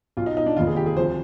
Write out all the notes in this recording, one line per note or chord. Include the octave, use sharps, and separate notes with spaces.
B1 B2 F4
D#4
D#4
D4
F1 D#2 D#3 F4
G#4
G4
G#4
D2 C3 F3 C5